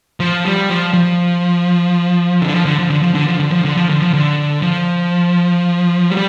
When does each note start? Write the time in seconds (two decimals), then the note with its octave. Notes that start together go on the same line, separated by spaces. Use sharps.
0.20 F3
0.45 G3
0.69 F3
0.94 F3
2.42 D3
2.54 F3
2.65 D3
2.78 F3
2.90 D3
3.03 F3
3.15 D3
3.27 F3
3.40 D3
3.52 F3
3.65 D3
3.77 F3
3.89 D3
4.02 F3
4.14 D3
4.62 F3
6.10 G3